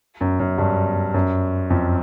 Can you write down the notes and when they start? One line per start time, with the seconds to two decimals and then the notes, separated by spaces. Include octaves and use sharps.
0.21 F#2
0.40 F#2
0.58 G2
1.14 F#2
1.70 F2